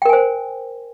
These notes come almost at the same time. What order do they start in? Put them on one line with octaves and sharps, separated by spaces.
G5 A#4 G#5 C5